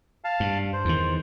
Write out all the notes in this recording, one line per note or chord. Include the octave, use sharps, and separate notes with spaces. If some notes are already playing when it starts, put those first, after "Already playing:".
F5 A5
G2
C5
E2 D#3